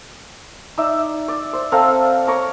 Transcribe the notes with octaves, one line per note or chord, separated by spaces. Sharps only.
D#4 D5 E5
D5
C5
C4 A4 F5 A#5
C#5 A#5 D6